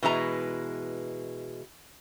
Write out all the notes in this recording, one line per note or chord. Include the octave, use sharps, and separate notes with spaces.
B2 E3 G#3 A#5